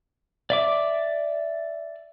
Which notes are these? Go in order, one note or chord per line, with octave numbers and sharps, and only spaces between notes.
D5 E5 D6